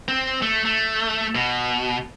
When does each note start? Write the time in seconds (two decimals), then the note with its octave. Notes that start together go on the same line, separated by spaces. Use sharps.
0.08 C4
0.42 A3
0.65 A3
1.35 B2